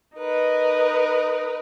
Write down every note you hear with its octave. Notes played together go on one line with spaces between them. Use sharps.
D#4 A#4 B4